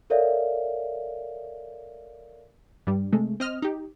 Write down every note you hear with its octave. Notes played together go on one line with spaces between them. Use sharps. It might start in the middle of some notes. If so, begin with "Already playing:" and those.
A4 A#4 C#5 D5 E5 F5
G2 G3
C3 G#3 A3
C4 D#5 F6
D#4 G4